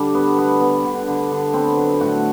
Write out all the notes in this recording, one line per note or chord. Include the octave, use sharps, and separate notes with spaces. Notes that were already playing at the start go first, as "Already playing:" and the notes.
Already playing: D3 G3 D4
B3
B3
B3
D3
D3
D3
B3 C4
F#3
A2 F#4